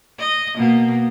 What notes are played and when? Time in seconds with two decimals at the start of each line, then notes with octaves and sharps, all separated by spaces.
0.18 D#5
0.56 B2 A#3